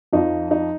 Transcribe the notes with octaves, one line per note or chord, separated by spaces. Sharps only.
F2 F3 D#4
D#4